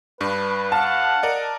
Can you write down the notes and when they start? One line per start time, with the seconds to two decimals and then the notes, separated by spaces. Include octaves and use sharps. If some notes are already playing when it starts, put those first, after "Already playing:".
0.21 G2 D4 B4
0.72 F5 F#5 A5
1.23 A#4 D5 D#5